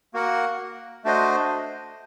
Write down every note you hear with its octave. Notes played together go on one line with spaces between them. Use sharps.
A#3 F#4 A#4 F#5
A3 D4 F#4 C5 D#5